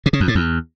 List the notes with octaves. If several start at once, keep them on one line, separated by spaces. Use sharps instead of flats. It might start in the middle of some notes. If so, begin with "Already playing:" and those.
C3
C#3
F2
A2
E2